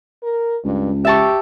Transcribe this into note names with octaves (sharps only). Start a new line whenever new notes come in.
A#4
C#2 G2
G4 E5 A5 C#6